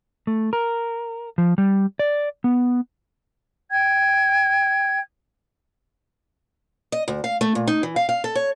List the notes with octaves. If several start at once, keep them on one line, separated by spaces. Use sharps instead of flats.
A3
A#4
F3
G3
D5
B3
G5 G#6
D#5
D2
F5
A3
A#2
D#4
E3
F5
F5
A4
C#5